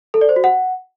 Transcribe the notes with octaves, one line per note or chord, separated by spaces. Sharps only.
A4
D5
C5
F#4
F#5